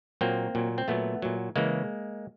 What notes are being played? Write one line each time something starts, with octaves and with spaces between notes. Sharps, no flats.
A#2 F#3 A#3 C4
A#2 F#3
C4
A#2 F#3 A3 B3
A#2 F#3
C#3 E3 G#3 A#3